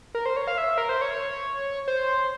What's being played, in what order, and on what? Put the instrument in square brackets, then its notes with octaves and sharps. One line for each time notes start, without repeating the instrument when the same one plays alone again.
[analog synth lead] A#4
C5
C#5
F5
E5
A#4
C5
C#5
C5